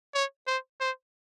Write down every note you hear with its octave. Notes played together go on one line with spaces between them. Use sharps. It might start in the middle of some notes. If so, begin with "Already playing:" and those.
C#5
C5
C5